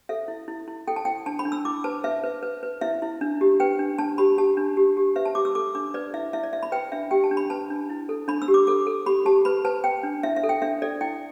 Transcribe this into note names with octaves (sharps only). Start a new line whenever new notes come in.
A4 E5
E4
E4
E4
A4 G5
A5
E4 G5
D4 A5
B5
D4
E6
E4 D6
B4 A5
B4 E5
B4
B4
B4
E4 E5
E4
D4
G4
B4 G5
D4
D4 A5
G4 B5
G4 A5
D4
G4
G4
B4 E5
A5
G4 D6
E6
A4 D6
D4 D6
B4 D5
E4 E5
E4 E5
D5
E4 E5
B5
B4 G5
D4 E5
G4 G5
A5
D4
B5
B4 A5
D4
E4
A4
D4 B5
E6
G4
D6
A4 D6
A4
G4 B5
G4 A5
B4 B5
B4 A5
B4 G5
D4
E4 E5
E5
A4
G5
D4 E5
A4 D5
E4 G5